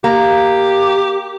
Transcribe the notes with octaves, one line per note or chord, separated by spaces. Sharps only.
A#3 G4